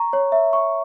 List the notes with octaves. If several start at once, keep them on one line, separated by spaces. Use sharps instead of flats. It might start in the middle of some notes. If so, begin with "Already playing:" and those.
Already playing: A#5 C#6
C#5
E5
C#6